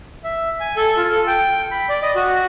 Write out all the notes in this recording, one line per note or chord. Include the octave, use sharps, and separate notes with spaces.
E5
G#5
A4
F4
A4
G5
B5
D5
D#5
F#4